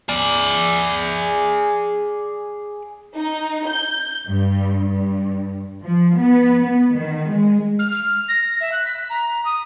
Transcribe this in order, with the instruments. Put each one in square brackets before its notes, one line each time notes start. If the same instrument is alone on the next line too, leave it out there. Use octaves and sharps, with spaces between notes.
[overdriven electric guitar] G#4 D5
[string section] D#4
G6
G2
G2
[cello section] F3
B3
B3
D#3
G#3
[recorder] F6
F6
A#6
E5
F#6
B6
A#5
D#6